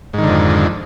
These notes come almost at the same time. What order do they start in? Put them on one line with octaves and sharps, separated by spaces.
G#2 D#3 D3 F2